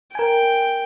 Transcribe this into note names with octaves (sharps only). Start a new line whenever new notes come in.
A#4 G5 G#5